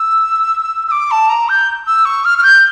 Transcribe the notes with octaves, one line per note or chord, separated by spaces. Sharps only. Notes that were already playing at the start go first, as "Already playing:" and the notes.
Already playing: E6
E6
D6
A5
A#5
G6
E6
C#6
F6
F6
G6